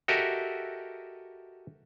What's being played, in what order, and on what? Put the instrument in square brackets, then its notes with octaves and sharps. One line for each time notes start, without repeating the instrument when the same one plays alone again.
[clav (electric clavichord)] F#4 G4 A4 A#4 D#5 E5